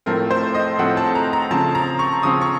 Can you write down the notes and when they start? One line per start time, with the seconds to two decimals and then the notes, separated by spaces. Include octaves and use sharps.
0.06 A2 F3 A3 C4 A#4
0.31 C5
0.55 D#5
0.78 A2 F3 A3 C4 F#5
0.97 A5
1.15 A#5
1.33 A#5
1.51 C#3 F3 C4 A5
1.75 A#5
1.99 C#6
2.23 C#3 F3 C4 D#6
2.41 C#6